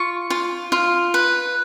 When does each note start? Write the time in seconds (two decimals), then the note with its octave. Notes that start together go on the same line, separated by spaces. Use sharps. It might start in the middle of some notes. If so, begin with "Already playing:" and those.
Already playing: F4 C#6
0.30 F4
0.72 F4
1.14 B4